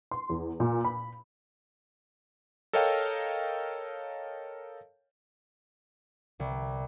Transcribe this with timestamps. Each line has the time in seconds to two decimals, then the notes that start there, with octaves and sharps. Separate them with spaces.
0.11 C6
0.30 E2
0.60 A#2
0.85 B5
2.73 A4 A#4 C#5 D#5 F5 G5
6.40 C2